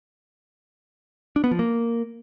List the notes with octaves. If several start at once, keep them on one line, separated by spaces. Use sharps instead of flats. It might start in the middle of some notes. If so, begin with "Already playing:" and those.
D4
B3
F3
A#3